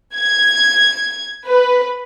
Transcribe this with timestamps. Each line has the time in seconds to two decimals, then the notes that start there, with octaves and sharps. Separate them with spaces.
0.15 G#6
1.46 B4